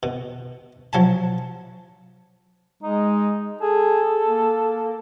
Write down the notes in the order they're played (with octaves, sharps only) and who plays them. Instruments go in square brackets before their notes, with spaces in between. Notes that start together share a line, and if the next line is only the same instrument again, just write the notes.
[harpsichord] B2
F3 F#3 G#5 A5
[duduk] G#3 [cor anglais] D#4
[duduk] G#4 [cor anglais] A4
[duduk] A#3